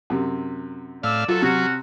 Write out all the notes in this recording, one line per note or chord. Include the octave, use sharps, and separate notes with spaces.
F#2 C3
A2 D5 F5 E6
F#3 F4 A4
C3 C#4 F#4